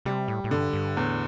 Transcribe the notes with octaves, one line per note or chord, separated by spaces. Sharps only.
C3 G3
A2
A2
G2 D3
G2
E2 A2